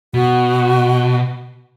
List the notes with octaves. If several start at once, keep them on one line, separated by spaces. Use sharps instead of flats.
B2 F#4